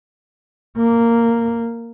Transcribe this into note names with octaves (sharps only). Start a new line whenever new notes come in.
A#3